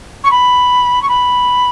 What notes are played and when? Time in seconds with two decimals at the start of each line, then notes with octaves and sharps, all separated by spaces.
0.24 C#6
0.31 B5
1.02 C#6
1.08 B5